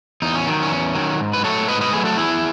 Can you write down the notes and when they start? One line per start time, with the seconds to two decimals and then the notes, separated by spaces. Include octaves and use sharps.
0.22 E2 D#4
0.35 C#4
0.47 D#3 F#3
0.62 C#4
0.71 E2
0.95 D#3 F#3
1.19 G#2
1.33 B4
1.44 F#3 A3 A4 C#5
1.68 G#2 B4 D#5
1.81 B4 D#5
1.93 F#3 A3 G#4 B4
2.05 F#4 A4
2.17 E2 E4 G#4